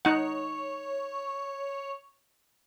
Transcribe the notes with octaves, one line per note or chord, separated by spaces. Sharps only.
D#4 C#5 F#5